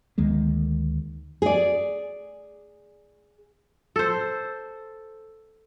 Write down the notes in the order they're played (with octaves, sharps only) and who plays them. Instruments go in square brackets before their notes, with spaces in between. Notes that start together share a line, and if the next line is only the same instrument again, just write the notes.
[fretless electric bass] D2 D#3 G#3 A#3
[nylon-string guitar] G#4 D5
[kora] A4 C5